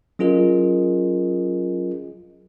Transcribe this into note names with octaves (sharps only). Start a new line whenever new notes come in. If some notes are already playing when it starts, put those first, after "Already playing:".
F#3 C#4 F4 G#4 A#4 D#5